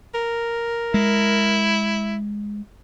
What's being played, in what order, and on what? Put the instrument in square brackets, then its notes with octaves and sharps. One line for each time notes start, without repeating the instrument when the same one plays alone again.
[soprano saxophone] A#4
[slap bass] G#3 [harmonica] E4